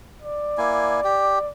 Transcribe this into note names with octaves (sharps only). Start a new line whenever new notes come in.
D5
A#3 E4 G#5
G4